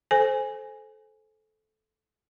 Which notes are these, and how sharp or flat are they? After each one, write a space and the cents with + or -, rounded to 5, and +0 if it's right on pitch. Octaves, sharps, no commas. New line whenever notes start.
A4 -15 C5 +0 G#5 +0